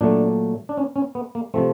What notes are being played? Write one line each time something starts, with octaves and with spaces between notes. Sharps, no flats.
A#2 F#3 A3 D4
D4
C#4
C#4
B3
A#3
C3 F3 A3 C4